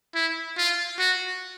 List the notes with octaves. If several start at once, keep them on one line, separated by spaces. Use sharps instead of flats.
E4
F4
F#4